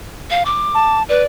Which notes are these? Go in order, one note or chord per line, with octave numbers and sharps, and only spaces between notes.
F5
D6
A5
B4 D5